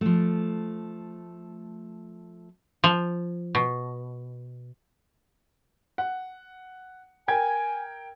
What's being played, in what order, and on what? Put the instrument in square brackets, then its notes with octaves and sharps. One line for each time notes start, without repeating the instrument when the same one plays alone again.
[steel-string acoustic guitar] F3 A3
[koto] F3
B2
[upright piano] F#5
[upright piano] A#4 G5 G#6 [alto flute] G#5